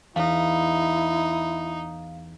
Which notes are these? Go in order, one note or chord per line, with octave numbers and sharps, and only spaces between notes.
E2 D#4 E4 F5